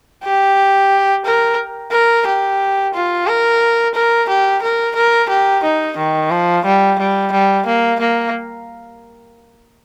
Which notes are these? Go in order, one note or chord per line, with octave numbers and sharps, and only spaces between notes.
G4
A#4
A#4
G4
F4
A#4
A#4
G4
A#4
A#4
G4
D#4
D#3
F3
G3
G3
G3
A#3
A#3